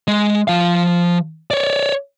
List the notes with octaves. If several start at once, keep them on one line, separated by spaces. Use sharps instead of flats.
G#3
F3 F5
C#5 D5